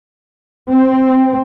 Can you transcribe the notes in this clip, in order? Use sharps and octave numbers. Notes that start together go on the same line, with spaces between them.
C4